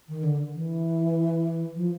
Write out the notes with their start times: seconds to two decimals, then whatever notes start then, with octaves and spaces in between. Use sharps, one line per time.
0.08 D#3
0.23 D3
0.54 E3
1.76 F3